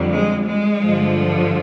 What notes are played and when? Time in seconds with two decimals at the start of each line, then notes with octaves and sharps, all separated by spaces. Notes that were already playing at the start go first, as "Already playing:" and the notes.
Already playing: F2 D3 G3
0.12 G#3
0.48 G#3
0.83 G2 D3 F3